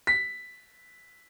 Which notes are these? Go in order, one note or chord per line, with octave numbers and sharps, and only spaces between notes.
B6